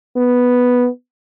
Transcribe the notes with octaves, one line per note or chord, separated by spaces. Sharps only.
B3